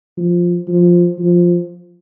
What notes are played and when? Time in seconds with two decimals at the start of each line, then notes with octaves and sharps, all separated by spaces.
0.18 F3
0.68 F3
1.20 F3